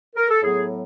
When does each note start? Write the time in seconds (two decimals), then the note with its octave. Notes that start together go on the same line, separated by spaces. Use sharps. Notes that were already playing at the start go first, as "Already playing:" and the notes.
0.16 A#4
0.30 A4
0.43 A2 F#3 B3 G#4